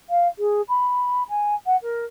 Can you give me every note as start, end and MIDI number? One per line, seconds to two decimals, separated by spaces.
0.10 0.28 77
0.39 0.62 68
0.69 1.23 83
1.29 1.55 80
1.66 1.76 78
1.83 2.05 70